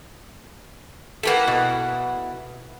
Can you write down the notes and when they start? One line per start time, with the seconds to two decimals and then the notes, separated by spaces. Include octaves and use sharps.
1.23 A#3 E4 G4 A4 B4 F#5
1.47 B2